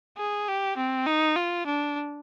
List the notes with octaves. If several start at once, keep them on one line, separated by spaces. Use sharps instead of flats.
G#4
G4
C4
D#4
F4
D4